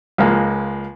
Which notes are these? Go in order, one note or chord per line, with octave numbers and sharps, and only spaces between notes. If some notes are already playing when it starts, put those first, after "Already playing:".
C#2 F3 G#3 A#3